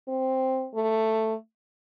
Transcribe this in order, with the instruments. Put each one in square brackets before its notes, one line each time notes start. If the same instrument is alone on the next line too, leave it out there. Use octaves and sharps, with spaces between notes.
[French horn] C4
A3